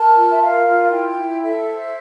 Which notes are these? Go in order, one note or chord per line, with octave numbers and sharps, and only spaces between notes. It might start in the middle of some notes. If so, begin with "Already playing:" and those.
Already playing: A#4 A5
F4
E5
A#4 F5
F4
E4 G5
E4
A4 E5
C5